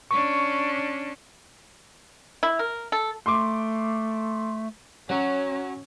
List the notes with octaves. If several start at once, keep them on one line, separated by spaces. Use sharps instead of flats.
C#4 D4 C#6
E4
A#4
A4
A3 C6 D6
F#3 C#4